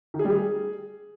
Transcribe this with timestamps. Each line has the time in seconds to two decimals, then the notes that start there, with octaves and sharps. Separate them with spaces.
0.14 D#3
0.19 G#4
0.25 G3
0.30 G#4